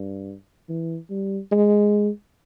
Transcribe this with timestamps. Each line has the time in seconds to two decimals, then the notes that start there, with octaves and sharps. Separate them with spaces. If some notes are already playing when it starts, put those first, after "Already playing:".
Already playing: G2
0.69 E3
1.10 G3
1.52 G#3